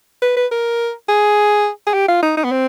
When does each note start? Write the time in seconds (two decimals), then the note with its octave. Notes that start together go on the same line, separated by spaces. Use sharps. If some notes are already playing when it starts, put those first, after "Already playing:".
0.22 B4
0.37 B4
0.51 A#4
1.09 G#4
1.87 G#4
1.94 G4
2.08 F4
2.23 D#4
2.37 D#4
2.45 B3
2.52 C4